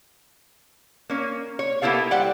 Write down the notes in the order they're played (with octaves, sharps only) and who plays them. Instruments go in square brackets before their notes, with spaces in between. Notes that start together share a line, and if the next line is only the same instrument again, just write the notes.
[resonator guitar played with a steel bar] A#3 C#4
C#5
A#3 B3 E4 G4 A4 F5
G3 C5 D5 F#5 G5